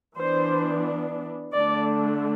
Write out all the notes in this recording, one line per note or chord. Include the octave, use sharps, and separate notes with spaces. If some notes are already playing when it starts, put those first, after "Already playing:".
E3 B3 D4 C5
D3 A3 D4 D5